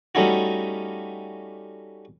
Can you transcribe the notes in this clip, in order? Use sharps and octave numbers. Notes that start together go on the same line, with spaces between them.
G3 A3 C#4 D#4 E4 F#4